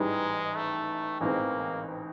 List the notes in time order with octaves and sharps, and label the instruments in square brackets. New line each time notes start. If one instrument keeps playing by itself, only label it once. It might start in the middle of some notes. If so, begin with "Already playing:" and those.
Already playing: [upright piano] A1 G#2 E3 G3 [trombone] G#3
[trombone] A3
[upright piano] A1 G#2 E3 G#3 C4 [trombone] A#3